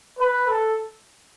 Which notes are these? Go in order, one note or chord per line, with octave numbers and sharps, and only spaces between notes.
B4
A4